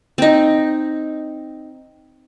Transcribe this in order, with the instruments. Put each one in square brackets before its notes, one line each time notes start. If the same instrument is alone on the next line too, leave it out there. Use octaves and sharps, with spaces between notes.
[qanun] C4 D#4